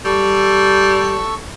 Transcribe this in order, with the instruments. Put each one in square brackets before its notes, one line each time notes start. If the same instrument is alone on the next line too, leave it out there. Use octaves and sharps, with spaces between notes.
[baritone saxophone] G3 [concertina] A4 C#6 E6